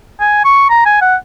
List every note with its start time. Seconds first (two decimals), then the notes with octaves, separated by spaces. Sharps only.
0.20 G#5
0.45 C#6
0.70 A#5
0.86 G#5
1.01 F#5